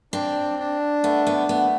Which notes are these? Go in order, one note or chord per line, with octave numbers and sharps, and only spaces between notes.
C4 D4
D4
A3 B3
B3
A3 B3